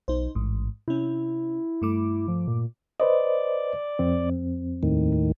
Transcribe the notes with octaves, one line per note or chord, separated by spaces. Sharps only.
B1 D#4 C5
A1 G#2
C3 C#4 E4
G2 A3 D6
F3
A#2
B4 C5 D5 D#5
F2 C4
D#2 A2 D#3